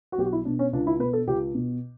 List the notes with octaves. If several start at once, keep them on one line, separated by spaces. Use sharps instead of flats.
F#4
B1 G4
F#4
E4
B2 D4
C#4
C#2 D4
E4
B2 B4
A4
C#2 G4
B2